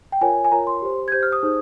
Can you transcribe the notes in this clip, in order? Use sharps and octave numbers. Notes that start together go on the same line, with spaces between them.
G5
F4 A#4 C#5 G#5
G#5
F4 A#4 C#5 A#5
C6
G4 C5
G#6
G4 C5 G6
F6
D#6
D#4 G#4 C5